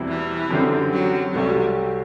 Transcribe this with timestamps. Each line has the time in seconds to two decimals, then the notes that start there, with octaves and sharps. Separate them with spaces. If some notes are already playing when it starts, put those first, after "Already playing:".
Already playing: E2 B2 G3 C4 E4
0.08 E3
0.51 F#2 D3 G3 C4
0.93 F#3
1.34 C2 C3 F#3 G3 A3 C4